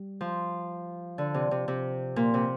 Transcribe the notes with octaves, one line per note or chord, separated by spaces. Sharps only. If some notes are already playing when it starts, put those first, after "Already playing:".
Already playing: G3
F3
D3
C3
C3
C3
A#2
C3